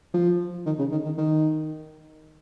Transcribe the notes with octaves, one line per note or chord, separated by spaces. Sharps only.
F3
D#3
C#3
D#3
D#3
D#3